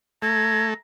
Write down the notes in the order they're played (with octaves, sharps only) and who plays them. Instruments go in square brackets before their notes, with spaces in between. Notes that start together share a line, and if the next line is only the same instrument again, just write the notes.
[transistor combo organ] A3 [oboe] A#5 [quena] G#6